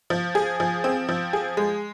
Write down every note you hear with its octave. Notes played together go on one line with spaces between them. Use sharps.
F3
G#4
F3
C4
F3
G#4
G#3